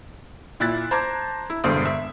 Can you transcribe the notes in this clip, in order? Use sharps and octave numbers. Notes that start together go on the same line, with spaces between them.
A#2 E4 F#6 A6
C5 A5 A#5 D6 G#6
E4
E1 G2 D3 C5 D#6
E5